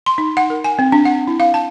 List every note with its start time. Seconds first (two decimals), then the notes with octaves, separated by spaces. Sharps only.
0.06 C6
0.18 D#4
0.37 F#5
0.50 A#4
0.64 G#5
0.79 C4
0.92 D4
1.05 F#5
1.27 E4
1.40 F5
1.54 A5